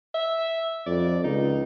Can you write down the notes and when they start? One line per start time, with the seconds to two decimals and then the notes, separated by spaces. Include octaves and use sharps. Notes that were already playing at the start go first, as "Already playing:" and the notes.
0.14 E5
0.87 F2 D5
1.24 C#2 D#4